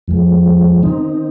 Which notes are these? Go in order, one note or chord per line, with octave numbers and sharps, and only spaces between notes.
F2 F3 G#3
D#3 C4 D#4